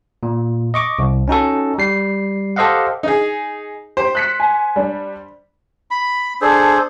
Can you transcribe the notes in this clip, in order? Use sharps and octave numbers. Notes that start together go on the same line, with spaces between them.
A#2
D#5 C#6 D6
C2
C#4 D#4 F#4 A4
G3 C7
G4 A4 C5 D#5 F5 F#5
D#4 G#4
G4 C5
F#6 B6 C#7
G#5
G3 D4
B5
D4 G#4 A4 C5